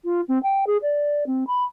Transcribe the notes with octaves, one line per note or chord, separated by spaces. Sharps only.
F4
C4
G5
G#4
D5
C4
B5